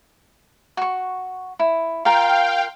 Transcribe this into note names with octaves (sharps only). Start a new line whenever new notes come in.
F#4 C#6
E4
F4 A#4 F5 G5